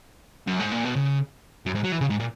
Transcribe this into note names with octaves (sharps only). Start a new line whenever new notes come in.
F#2
G#2
A#2
B2
C#3
F#2
G#2
F#3
E3
C#3
G#2
A#2